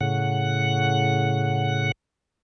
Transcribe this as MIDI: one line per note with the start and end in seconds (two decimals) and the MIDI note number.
0.01 1.92 45
0.01 1.92 49
0.01 1.92 78